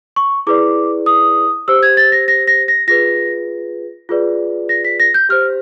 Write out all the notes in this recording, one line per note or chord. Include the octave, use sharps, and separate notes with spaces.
C#6
E4 G#4 B4 D5 D6
D#6
G4 C5 E6
G#6
A6
A#6
A#6
A#6
A#6
F4 G#4 B4 A#6
F4 G#4 B4 D5
A#6
B6
A#6
G6
G4 C5 F6